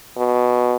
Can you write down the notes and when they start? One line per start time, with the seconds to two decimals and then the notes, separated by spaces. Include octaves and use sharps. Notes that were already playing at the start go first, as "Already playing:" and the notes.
0.17 B2